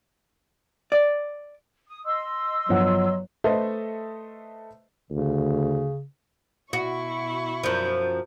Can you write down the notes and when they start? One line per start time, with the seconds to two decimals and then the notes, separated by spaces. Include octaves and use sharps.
0.92 D5
1.87 D#6
2.05 D#5 C6 E6
2.69 G1 F3 F#3 F#5
3.44 A3 A4 B4 C5 D#5 E5
5.11 D2 C#3
6.73 B2 E4 F#4 C#6
7.63 F#2 F3